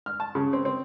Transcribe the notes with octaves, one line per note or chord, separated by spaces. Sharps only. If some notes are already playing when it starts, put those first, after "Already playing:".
F6
A5
C#3
C4
C4